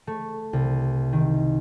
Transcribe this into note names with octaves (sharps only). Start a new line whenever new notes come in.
A3
C2
D#3